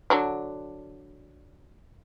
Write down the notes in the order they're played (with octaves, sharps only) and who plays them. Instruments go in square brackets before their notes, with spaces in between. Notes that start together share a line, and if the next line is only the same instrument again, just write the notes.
[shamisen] D3 F#3 D4